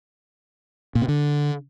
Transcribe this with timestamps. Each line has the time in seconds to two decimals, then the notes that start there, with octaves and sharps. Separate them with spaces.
0.95 A#2
1.02 C3
1.08 D3